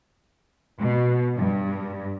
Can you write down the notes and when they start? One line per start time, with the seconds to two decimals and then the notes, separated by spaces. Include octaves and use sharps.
0.80 B2
1.37 G2